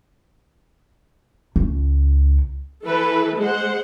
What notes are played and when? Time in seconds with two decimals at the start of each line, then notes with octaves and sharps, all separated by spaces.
1.56 C#2
2.84 E3 A4 B4
3.38 G#3 C5 F#5